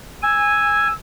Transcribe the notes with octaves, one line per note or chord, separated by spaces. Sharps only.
G#5 E6